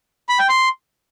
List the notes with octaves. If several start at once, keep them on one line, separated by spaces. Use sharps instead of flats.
B5
G5
C6